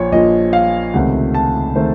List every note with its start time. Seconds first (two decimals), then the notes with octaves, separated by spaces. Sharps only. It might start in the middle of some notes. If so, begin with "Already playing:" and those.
Already playing: A#1 A#2 F3 C#5
0.12 A#1 A#2 F3 D#5
0.53 F5
0.94 C#2 C3 D#3 A3 F#5
1.34 A5
1.75 C3 D#3 A3 C5